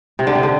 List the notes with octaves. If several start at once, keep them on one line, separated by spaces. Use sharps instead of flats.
C3
D3
C3
D3